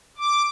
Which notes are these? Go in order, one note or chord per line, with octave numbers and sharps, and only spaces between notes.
D6